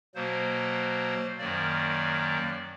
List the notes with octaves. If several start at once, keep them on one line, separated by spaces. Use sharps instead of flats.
B2 F#3 A#3 C5
F#2 D#3 F#3 A#3 D5